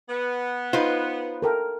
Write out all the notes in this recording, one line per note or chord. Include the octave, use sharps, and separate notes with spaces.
B3
D#4 F4 B4 C5
A4 A#4 G5